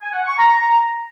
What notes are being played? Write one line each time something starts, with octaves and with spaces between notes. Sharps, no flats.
G#5
F#5
C#6
A#5